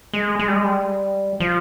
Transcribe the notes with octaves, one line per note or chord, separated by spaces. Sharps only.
G#3
G#3
G3
G#3
G3
F3